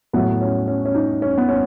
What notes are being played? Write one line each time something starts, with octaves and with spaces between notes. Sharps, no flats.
A2 F#3 B3
C#4
C#4
C#4
D#4
C#4
B3
C#4